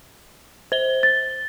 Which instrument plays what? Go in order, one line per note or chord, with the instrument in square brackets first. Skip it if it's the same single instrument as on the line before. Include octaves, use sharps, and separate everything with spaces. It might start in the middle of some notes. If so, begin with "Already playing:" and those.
[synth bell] C5 G7
[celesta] A6